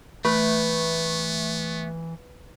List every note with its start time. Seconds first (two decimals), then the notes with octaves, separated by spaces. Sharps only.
0.25 E3 A3 B3 B4